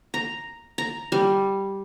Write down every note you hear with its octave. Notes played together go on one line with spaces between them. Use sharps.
A#5
A#5
G3